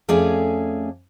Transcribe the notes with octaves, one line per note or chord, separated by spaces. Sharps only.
F2 A3 C#4 G#4 D5 G#5